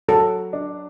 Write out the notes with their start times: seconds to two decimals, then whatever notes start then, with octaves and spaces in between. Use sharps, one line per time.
0.08 F#3 A4
0.53 D4